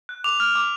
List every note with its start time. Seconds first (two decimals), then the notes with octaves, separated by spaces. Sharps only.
0.09 F#6
0.24 D6 F7
0.40 F6
0.55 D6